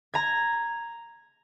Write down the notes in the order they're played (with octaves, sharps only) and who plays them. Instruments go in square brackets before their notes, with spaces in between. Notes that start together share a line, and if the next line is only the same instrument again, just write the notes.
[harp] A#5 G#6